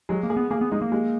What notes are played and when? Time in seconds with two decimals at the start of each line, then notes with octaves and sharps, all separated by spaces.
0.09 F#3 G#3
0.23 A#3
0.30 G#4
0.37 B3
0.51 A#3 G#4
0.61 B3
0.72 G#3 D#4
0.82 A#3
0.92 G#3